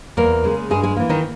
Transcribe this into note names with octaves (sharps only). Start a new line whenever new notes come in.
E2 A#3 A#4
C#3 G#3
G2 G#3 G#4
G#3 G#4
E3 A#3
D#3 D#4